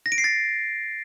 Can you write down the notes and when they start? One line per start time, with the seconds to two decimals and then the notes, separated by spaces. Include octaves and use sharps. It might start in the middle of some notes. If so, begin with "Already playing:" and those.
0.06 A#6
0.12 D7
0.18 C7
0.24 A6